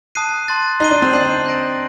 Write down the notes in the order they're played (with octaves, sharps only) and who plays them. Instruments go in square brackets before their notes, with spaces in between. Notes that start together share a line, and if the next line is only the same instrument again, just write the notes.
[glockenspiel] A5 D#6 F#6 C7 D#7
A5 C6 F#6 A6
[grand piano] D#4 [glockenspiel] C6 F#6 C7 D#7 G7
[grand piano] D4
C4
[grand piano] D4 [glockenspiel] G6 C7 F#7
[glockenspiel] G6 A#6 D7